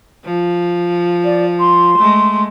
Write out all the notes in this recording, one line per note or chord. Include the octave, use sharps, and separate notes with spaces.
F3
D5
C6
G#3 A3